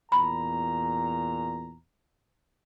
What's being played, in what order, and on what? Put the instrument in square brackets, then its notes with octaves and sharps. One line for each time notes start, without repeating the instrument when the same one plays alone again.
[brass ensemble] E2 A#2 A#5 [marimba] B5